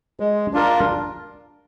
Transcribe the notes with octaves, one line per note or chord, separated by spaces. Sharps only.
G#3
D4 F4 A#4